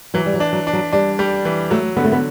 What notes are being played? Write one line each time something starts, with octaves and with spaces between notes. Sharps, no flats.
E3 F#3
G3
F#3
D4
F#3
D4
F#3
G3 D4
G3
E3
F#3 A3
D3 B3
A3
B3